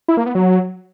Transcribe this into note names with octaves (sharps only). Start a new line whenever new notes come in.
E4
A#3
B3
F#3